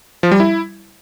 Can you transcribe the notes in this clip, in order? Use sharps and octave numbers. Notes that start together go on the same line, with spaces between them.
F3
G3
E4